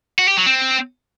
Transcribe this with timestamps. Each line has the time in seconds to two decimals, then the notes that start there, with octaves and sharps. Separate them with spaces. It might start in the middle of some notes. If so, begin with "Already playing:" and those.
0.19 F#4
0.28 G4
0.37 F#3
0.47 C4